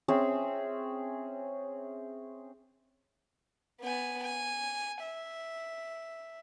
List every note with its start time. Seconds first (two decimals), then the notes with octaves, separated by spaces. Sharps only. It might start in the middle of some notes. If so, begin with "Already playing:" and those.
0.08 C4 C#4 G#4 E5
3.81 B3 G#5
4.24 G#5
5.03 E5